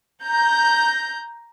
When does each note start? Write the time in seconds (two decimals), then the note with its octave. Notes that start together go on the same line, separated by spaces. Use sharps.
0.24 A#5 G6